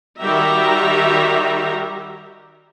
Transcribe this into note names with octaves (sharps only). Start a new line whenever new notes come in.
D#3 G3 F#4 G4 E5 A#5